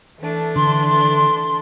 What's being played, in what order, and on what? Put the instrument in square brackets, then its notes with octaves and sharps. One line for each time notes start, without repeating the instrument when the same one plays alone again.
[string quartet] E3 A3 D4
[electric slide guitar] D3 [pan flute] C6